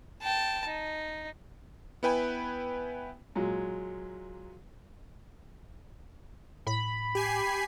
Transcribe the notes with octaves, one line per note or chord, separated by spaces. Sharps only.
G5 A5
D#4
B3 E4 B4 G5 G#5 B5
A#2 F#3 G#3
A2 B5
G4 G#5 C7